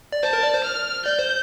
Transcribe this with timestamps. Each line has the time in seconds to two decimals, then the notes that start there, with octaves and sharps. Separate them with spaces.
0.12 D5
0.22 C5 A5
0.33 A#4
0.43 D5
0.53 C5
0.64 F6
1.05 D5 G6
1.19 C5